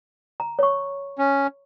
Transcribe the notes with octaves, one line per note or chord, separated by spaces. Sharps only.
A#5
C#5 C#6
C#4